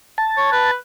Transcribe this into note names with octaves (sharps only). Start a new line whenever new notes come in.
A5
C#5
B4